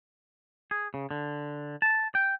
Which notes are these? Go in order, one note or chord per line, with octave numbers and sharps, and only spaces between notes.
G#4
C#3
D3
A5
G5